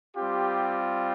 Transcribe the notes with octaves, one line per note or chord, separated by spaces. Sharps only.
G3 C4 F4 G4